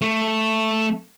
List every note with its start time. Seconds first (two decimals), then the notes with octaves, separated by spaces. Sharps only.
0.02 A3